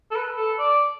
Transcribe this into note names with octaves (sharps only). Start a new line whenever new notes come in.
A4
B4
A4
D5